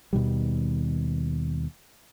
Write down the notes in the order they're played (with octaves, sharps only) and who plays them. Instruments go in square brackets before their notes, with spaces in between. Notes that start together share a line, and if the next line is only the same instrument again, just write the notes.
[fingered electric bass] D#2 B2 D#3 G3